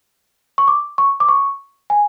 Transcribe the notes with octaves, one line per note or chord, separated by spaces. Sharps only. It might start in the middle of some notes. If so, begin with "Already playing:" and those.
C#6
D6
C#6
D6
C#6
G#5